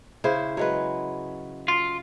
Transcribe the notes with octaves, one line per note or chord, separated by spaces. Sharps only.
C#3 E4 C5
F#3 G#3 B4
F4